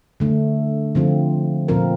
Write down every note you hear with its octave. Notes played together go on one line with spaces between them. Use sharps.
D3 A3 D4
D3 F3 C4 F4 A4
A#2 F3 C4 F4 A#4